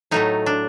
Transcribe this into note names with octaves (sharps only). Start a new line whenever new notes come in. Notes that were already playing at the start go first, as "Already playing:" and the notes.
A2 F#3 A3 D#4
D4